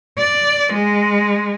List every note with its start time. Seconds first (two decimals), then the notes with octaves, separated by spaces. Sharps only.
0.18 D5
0.72 G#3